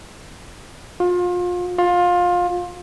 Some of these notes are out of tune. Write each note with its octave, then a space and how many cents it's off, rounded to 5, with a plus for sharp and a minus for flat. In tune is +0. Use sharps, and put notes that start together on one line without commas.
F4 +30
F4 +20